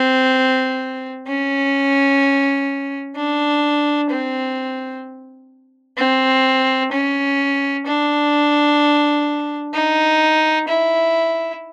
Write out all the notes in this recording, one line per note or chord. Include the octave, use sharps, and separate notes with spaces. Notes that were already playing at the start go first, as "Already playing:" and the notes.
Already playing: C4
C#4
D4
C4
C4
C#4
D4
D#4
E4